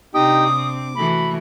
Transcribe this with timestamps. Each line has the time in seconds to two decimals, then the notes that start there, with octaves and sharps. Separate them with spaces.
0.14 C3 C4 D4 D#4 G4 G5 D#6
0.45 D6
0.95 E3 A3 F#4 B5